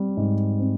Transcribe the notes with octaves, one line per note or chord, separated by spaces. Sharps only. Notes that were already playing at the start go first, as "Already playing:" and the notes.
Already playing: G3 C4
G#2
C4